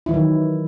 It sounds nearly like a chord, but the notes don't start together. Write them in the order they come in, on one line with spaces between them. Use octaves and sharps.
E4 E3 F#3 D#3